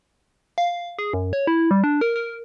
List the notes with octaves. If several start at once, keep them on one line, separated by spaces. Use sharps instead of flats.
F5
G#4
F#2
C#5
E4
G3
D4
A#4
A#4